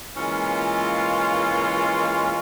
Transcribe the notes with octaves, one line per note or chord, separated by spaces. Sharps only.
E3 G#3 A#3 C#4 F4